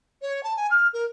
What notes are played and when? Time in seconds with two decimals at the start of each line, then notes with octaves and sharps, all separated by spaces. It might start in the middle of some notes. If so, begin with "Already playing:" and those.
0.21 C#5
0.43 A5
0.56 G#5
0.70 F6
0.93 A#4